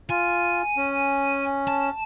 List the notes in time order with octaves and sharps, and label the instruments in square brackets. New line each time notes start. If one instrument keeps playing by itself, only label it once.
[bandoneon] F4 [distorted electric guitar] G#5
[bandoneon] C#4
[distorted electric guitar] A5